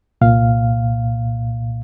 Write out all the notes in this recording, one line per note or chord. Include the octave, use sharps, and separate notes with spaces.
C2 A#2 F5